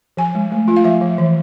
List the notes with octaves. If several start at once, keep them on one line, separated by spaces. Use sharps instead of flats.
F3 G#5
G#3
A3
F4
F5
F3 E5
F3
E3